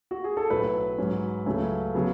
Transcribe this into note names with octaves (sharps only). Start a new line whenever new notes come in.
F#4
G#4
A4
B1 A2 F#3 B4
G#2 F#3 C#4
C#2 C#3 F#3 A3 C#4
C#3 F#3 B3